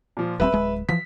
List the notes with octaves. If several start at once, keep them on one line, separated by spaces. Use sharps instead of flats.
A#2 F3
D#1 G3 C4 B4 E5 B5
D1 G#3
E3 F3 B6